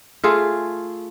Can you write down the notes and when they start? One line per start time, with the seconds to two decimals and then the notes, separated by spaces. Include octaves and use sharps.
0.24 A3 F4 G#4